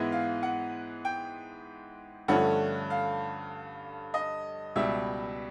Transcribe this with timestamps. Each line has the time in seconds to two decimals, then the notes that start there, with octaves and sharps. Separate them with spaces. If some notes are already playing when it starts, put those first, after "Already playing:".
Already playing: G#2 E3 G#3 B3
0.12 F5
0.43 F#5
1.05 G5
2.28 G2 D3 F3 A3 C#4 F#5
2.90 F5
4.14 D#5
4.76 C#2 B2 G3 E5